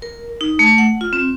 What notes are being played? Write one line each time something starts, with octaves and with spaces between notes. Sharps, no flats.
A#4
D#4
A3
F#5
F4
C4